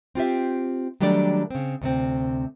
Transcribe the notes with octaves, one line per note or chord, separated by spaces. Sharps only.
C4 F4 G4 E5
D#3 F#3 G3 A3 D4 D5
C#3 C4
D2 C3 C4